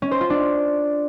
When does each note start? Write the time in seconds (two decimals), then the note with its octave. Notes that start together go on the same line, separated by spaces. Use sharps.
0.02 C#4
0.11 C5
0.21 F4
0.30 D4